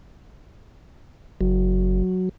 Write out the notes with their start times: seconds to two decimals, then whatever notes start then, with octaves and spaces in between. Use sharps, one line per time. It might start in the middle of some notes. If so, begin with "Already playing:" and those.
1.41 F#1 F#3